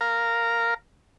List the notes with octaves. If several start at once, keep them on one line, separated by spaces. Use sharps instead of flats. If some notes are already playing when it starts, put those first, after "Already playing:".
A#4 F5 A#5